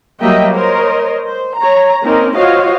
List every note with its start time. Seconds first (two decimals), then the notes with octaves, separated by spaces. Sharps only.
0.22 F#3 G3 A#3 D#5 E5 G5
0.54 A#4 C5 C#5 D#5
1.28 C5
1.58 C#5 A#5
2.04 A#3 C4 C#4 D#4 A#4
2.35 F4 F#4 C5 C#5 D#5 F5